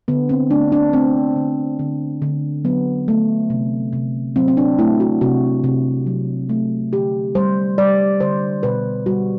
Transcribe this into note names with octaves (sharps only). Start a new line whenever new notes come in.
D3 B3
C4
A3 D4
D4
A3 C4
D3
D3
D3
F#3 B3
A3
C3
C3
F#3 C4
C4
D4
A3 E4
F#4
C3 F#4
C3
F#3
A3
D3 G4
G3 C5
G3 D5
D3 C5
B2 B4
G3 F#4